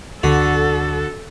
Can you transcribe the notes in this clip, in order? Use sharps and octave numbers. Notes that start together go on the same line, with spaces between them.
D2 D3 F#4 A4